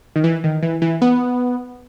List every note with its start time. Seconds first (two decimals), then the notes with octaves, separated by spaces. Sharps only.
0.16 D#3
0.24 E3
0.44 D#3
0.63 E3
0.82 E3
1.02 B3